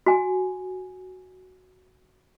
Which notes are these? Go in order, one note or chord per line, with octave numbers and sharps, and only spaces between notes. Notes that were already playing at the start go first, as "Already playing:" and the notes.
F#4 G#5